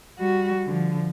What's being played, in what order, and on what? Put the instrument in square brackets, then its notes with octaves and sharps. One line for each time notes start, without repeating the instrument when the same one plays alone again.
[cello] G3 F#4
D3 F3